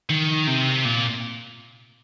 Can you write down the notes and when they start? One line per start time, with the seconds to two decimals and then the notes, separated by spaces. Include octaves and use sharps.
0.10 D#3
0.47 C3
0.85 A#2